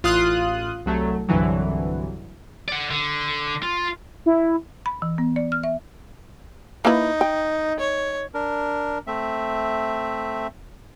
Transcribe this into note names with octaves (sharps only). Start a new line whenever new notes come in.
A1 F4 C6 D#6 F#6
C2 F#3 A3
C2 G2 D3 E3 F#3
D5 F#5
D3
F4
E4
B5
E3
B3
D5
F6
E5
A#3 D#4 E4 B4
G5
C#5
D4 A#4
A3 C4 E5